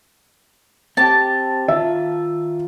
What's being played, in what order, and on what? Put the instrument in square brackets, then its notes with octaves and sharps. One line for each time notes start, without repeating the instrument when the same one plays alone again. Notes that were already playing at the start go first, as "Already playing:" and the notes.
[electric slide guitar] C4 G4 [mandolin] A5
[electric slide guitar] D#3 F4 [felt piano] E5